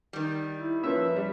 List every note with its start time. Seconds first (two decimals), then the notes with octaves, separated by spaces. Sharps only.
0.13 D#3 G3
0.56 E4
0.83 F3 A#3 C#4 B4 E5
1.16 G3